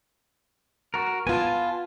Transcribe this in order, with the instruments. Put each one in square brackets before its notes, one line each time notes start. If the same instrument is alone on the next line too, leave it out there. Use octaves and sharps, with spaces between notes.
[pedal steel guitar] F#4 A#4
[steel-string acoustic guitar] B3 F4 [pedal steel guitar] G#5 A5